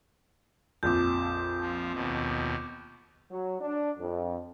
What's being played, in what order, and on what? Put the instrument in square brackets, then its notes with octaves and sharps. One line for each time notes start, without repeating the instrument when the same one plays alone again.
[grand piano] A#1 F2 [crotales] D6 G6
[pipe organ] F3
D#2 B2
[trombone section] F#3
D4
F2